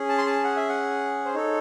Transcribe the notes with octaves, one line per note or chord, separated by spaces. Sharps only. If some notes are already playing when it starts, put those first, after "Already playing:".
Already playing: C#4 G#4
A5
C6
A5
F#5
E5
F#5
C5
D#4 A4 C#5